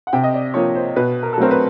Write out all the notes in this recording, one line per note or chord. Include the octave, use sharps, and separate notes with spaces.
F#5
C3 G5
D#5
D5
F3 A#3 C#5
C5
B2 B4
A#4
A4
F#3 A3 C4 A#4
B4